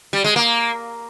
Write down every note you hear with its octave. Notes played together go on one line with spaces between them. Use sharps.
G3
G#3
A#3